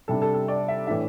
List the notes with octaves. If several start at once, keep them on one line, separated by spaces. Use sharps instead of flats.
C3 G3 D4 A4
A4
A4
D5
E5
A2 E3 A3 D4 E5